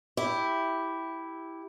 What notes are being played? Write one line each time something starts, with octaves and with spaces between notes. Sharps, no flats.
E4 G4